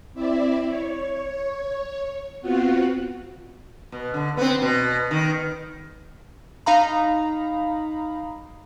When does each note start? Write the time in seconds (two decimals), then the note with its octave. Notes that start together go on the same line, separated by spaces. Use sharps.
0.14 C4 E4 D5 E5
0.67 C#5
2.41 B3 C4 F4 F#4 F#5
3.92 B2
4.14 D3
4.37 B3 C4
4.62 B2
5.11 D#3
6.66 D#4 F5 A#5 B5